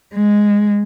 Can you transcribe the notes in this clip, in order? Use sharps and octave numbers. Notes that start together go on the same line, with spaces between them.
G#3